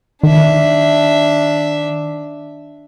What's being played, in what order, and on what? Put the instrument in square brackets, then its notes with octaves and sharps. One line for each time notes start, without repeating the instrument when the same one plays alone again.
[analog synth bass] D#3 [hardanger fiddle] D4 E5